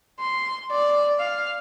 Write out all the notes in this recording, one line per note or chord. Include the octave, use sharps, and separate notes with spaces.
C6
D5
F5